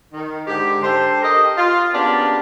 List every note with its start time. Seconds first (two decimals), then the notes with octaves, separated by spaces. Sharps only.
0.13 D#3
0.47 G#2 D3 G#3 G4
0.82 D4 G4 A4 C5
1.23 G4 A#4 D#5
1.57 F4
1.94 A#3 B3 C#4 D4 G4 G#4